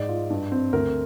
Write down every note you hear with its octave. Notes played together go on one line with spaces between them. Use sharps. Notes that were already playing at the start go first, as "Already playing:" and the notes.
Already playing: G#2 D5
F4
G2
C4
D2 A#4